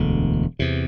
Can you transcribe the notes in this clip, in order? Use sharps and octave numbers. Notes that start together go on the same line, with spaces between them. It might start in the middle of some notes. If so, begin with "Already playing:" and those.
Already playing: E1 D2 D3
E2 C3